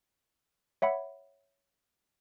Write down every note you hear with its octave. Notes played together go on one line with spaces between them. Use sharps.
C#5 E5 F#5 B5